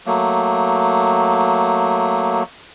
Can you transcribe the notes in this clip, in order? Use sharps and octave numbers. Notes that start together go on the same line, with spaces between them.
F#3 A3 A#3